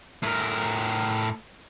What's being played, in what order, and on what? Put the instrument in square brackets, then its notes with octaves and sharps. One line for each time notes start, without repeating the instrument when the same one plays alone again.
[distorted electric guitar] A2 A#4